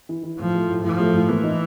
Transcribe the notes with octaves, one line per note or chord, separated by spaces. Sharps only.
E3
E3
A2 F3
A3
A2
A2 F3
A3
A2
E3 A#3
D#4